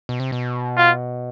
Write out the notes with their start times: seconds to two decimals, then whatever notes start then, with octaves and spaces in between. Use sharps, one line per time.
0.09 B2
0.20 C3
0.32 B2
0.77 F4